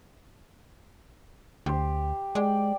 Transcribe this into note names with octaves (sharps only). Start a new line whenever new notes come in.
D2 G4 C5
G#3 D5 G5